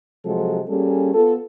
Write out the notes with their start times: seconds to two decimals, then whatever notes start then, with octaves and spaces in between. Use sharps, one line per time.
0.25 C3 F3 F#3 G#3 A4
0.69 G3 A#3 C#4 G#4 A4
1.14 B3 F4 A4